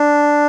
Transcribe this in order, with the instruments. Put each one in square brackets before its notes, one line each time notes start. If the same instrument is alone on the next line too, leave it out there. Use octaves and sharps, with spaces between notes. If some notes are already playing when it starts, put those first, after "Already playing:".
Already playing: [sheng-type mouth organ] D4